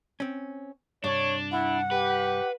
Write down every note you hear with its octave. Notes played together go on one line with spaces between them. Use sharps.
C4 C#4
C2 G2 D4 C#5
E4 F#5
G4 B4